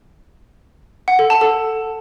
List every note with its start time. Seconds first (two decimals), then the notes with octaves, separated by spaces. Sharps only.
1.08 F#5
1.19 A4
1.30 A5
1.41 A4